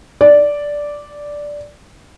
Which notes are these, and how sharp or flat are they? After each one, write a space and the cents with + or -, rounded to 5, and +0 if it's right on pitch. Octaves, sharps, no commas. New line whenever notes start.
D5 -5